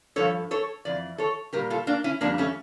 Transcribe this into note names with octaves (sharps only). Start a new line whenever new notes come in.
G2 F3 A4 C#5
A4 C#5
F2 E3 D5
A4 C#5
A#2 G3 G4 A#4
F4 A4
A#3 D4
C#4 E4
F2 E3 G3 A#3 D4
A3 C#4